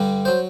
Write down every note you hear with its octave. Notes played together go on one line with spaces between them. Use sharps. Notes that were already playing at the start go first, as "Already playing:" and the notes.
Already playing: G2 D3 G3
F#3 C5